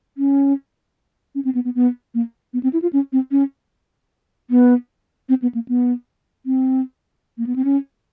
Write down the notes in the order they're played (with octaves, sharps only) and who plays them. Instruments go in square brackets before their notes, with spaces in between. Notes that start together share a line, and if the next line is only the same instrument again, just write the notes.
[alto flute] C#4
C#4
C4
B3
B3
B3
A#3
B3
C4
E4
F4
C#4
C4
C#4
B3
C4
B3
A#3
B3
C4
A#3
B3
C4
C#4